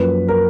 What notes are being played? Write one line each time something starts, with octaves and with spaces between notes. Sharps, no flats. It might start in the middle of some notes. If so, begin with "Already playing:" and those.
Already playing: F#2 F3 A#3 C#4 B4
A#4